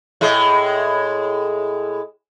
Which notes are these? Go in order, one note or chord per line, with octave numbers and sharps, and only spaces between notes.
A2 G#3